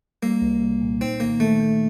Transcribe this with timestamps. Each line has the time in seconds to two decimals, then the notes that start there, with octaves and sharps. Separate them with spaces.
0.23 G3 A#3
0.42 C2
0.62 C2
0.81 A#2
1.01 C4 D#4
1.20 D#3 A#3
1.40 D#3 A3
1.60 A#3